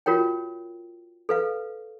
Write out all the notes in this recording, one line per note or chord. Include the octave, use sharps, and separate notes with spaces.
F4 F#4 A#4 C#5 G5
A4 B4 F5